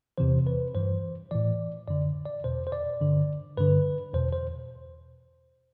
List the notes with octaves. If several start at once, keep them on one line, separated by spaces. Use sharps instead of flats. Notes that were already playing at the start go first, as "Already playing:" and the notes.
E2 C3 E3 C5
B4
G2 E3 C5
A2 E3 D5
F#2 D3 D5
D5
E2 B2 C5
C5
D5
G2 D3
G2 D3 B4
E2 B2 C5
C5